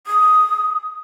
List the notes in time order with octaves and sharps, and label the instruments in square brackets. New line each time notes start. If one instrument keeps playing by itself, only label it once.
[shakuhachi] D#6